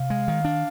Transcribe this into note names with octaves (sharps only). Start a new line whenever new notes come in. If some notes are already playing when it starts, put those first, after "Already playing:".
Already playing: C3 F5
G#3
D#3
D4